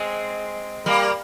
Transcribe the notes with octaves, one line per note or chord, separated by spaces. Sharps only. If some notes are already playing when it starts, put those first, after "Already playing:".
Already playing: G#3 C4
G3 A#3